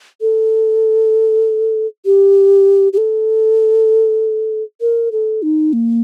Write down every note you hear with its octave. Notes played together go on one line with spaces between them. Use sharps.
A4
G4
G4
A4
A#4
A4
D#4
A#3